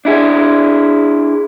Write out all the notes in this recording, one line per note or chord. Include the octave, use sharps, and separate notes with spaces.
D4 E4 G#4